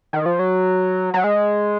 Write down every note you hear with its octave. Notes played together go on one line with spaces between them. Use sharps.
D#3
F3
F#3
F#3
G#3